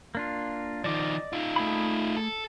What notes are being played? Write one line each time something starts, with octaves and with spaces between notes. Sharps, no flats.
A#3 D4 F4
D#3 F3 D5 D#5 D6
D#4 F4
A3 G#4 B5
A4